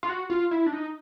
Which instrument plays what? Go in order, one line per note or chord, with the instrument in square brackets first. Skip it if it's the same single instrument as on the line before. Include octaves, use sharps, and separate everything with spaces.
[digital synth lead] F4
F#4
F4
E4
D4
D#4